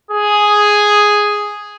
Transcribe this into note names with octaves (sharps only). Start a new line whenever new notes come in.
G#4